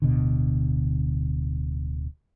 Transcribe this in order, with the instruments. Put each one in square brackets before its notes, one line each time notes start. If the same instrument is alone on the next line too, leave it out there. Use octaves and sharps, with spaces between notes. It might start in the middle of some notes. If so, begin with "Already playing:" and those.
[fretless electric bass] D1 B2 D3